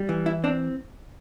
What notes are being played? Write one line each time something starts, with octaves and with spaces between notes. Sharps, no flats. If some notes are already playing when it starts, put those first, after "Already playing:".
Already playing: G3
E3
E4
C4 D4